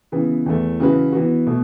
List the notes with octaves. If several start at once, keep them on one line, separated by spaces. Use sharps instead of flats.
C#3 E3 B3
E2 E3 A3
C#3 E3 C#4 F#4 B4
E3 B3 F#4
B2 A3